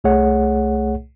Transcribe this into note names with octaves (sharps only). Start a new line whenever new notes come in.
C2 A3 G#4 C#5 F#5